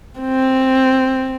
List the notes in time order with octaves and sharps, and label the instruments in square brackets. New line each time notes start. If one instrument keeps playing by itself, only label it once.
[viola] C4